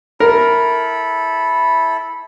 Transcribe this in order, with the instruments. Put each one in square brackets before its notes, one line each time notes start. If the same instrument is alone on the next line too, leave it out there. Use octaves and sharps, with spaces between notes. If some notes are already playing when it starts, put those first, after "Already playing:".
[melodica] E4 A4 B5 [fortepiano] A#4